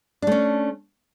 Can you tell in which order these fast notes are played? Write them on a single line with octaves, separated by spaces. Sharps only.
D4 A3 C#4